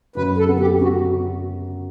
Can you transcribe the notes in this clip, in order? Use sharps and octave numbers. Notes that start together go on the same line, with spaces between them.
F#2 B4
A4
B3
G4
B3 F#4